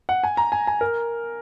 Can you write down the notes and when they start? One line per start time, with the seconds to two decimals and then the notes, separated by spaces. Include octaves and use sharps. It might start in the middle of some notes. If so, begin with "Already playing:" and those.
0.09 F#5
0.24 G#5
0.37 A#5
0.52 G#5
0.67 G#5
0.81 A#4